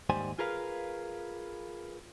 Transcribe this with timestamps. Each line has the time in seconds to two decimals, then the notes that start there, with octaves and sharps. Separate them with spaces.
0.10 D#2 G#2 G3 C5 G#5
0.39 F4 G#4 A#4 B4 F5